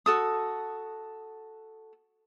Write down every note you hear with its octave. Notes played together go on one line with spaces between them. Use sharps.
F#4 A4 D#6